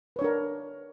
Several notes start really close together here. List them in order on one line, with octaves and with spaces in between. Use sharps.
B4 C#5 D4 A#4